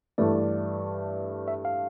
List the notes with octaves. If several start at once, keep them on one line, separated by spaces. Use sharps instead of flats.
G2 E3 A3 D5
E5
F5